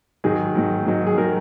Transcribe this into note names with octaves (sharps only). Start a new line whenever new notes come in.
G#2 D#3 F#3 G#4
G#2 D#3 F#3
G#2 D#3 F#3
G#4
D#3 F#3 A#4